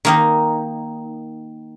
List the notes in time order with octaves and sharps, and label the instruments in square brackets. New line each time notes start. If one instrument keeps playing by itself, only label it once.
[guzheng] D#3 A#3 D#4